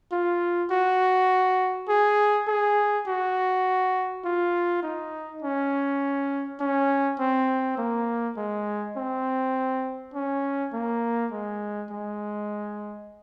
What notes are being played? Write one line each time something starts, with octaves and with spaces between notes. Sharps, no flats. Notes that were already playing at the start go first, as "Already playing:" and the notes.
F4
F#4
G#4
G#4
F#4
F4
D#4
C#4
C#4
C4
A#3
G#3
C4
C#4
A#3
G#3
G#3